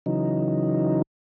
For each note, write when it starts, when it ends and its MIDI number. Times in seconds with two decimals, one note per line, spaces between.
0.06 1.02 49
0.06 1.02 52
0.06 1.02 54
0.06 1.02 63